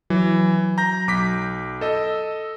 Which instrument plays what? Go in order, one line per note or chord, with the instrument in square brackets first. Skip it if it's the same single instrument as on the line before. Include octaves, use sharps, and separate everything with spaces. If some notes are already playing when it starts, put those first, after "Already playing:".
[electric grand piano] E3 [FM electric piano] F#3
[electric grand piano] A#5 G6 A#6
B1 D6 B6
[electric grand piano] A4 D#5 [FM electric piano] E6